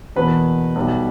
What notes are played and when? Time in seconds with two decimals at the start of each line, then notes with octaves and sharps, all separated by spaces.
0.16 E2 B2 A#3 B4
0.76 B1 B2 G3